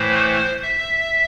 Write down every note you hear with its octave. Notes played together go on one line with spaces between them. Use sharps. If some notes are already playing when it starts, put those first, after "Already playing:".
Already playing: A2 E3 A3 C5
E5